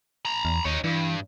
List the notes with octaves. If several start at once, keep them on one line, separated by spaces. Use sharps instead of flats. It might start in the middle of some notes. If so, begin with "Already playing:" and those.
A#5 B5
E2
D#2 D#4 C#5
G2 E3